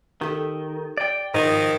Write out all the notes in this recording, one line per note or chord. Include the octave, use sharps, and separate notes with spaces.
D#3 G4 A4
D5 G5
G#2 D#3 F3 A#4 D#5